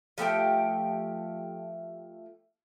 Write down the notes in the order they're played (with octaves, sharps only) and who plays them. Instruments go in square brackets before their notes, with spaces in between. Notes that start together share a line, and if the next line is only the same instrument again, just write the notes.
[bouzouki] F3 A3 G4 G5